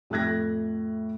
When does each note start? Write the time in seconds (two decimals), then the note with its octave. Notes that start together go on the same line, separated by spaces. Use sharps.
0.10 F2 A2 A3 F#6 G#6 A#6